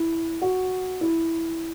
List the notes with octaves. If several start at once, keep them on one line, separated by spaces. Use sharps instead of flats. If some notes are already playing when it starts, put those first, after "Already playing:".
Already playing: E4
F#4
E4